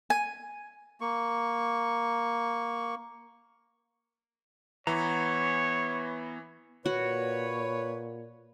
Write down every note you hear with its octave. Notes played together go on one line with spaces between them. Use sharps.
G#5
A#3 C#6
E3 B3 C#5 A#5
A#2 F#4 B4 C#5